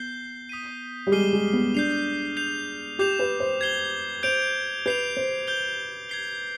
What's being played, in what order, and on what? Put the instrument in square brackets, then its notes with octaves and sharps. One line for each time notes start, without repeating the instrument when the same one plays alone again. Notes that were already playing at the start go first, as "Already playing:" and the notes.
Already playing: [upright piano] B3 [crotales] G6 C7 G7
[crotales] D#6 B6 D#7
[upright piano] G3
[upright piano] G#3 [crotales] D6 F6 C7 D#7 G7
[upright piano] G#3
B3
[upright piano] D4 [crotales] G6 C7 F7
[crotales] G6 C7 F7
[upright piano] G4 [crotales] D6 G6 C7 F7
[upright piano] B4
C5
[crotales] G#6 C7 G7
[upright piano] C5 [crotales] G6 D7 F7
[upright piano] B4 [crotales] G6 C7 F7
[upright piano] C5
[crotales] G6 D7 G7
G#6 C7 G7